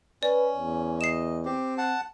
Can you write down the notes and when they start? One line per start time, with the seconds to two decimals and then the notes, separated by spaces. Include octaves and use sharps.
0.23 C#4 B4 D5
0.55 E2
1.01 D#5 C7 E7
1.45 C4 G4
1.78 F#5 A5